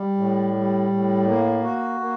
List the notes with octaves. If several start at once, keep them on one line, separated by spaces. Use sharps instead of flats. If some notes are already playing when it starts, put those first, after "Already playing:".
Already playing: G3
A2
G3
A2
A#3
F#4
A#3